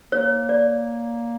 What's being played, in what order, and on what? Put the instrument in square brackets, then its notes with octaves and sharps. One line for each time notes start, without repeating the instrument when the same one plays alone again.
[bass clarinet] A#3 [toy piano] C#5
[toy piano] D5